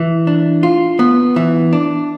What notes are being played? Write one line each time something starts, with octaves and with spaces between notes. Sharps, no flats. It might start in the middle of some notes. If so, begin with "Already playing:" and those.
Already playing: E3
D4
F4
B3
E3
D4